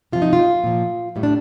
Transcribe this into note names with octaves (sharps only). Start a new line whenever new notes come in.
C3 F3 F4
D#4
F4
A#2 F3
A2 G3
D4